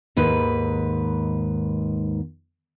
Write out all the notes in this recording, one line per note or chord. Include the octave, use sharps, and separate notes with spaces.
D#2 G#2 B4